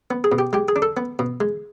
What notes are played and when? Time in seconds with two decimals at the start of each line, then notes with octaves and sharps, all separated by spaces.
0.11 B3
0.24 G#4
0.32 B2
0.39 G4
0.53 G#3 G4
0.68 G#4
0.76 D4
0.82 A4
0.97 B3
1.19 B2
1.40 G#3